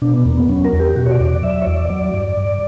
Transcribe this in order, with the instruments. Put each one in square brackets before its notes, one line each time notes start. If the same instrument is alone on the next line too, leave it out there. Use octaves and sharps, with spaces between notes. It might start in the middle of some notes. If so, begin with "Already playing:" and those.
[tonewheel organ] B2 D4
B3
E2 A#3
B3
F#3 C#4
A#4
E2
G4
B2 F#4
C#5
D5
E2
D5
F#3 E5
C#5
E2 D5
F#3 D5
G2
G2